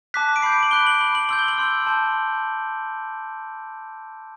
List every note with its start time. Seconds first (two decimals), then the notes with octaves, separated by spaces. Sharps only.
0.14 A5 D6 F#6 B6
0.29 B6
0.36 D7
0.42 B5 D6 G6 C7
0.52 D7
0.63 F#7
0.71 B5 F#6 G7
0.86 F#7
1.01 B5 F#6
1.15 F#7
1.29 C6 E6 G6 F#7
1.39 G7
1.48 F#7
1.58 C6 E6 G6
1.86 A5 C6 G6